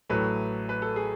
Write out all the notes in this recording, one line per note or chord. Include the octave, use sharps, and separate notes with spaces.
A1 A2 F#3 A3 B4
B4
A4
G#4